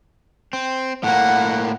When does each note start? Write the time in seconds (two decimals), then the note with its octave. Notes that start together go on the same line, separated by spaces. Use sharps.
0.53 C4
1.04 A2 A#3 F#5